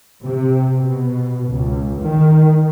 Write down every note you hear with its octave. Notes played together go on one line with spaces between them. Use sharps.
C3
B2
C#2
D#3